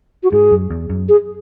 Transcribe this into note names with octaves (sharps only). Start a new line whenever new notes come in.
F#4
G#2 G#4
F#2
E2
F#2
G#4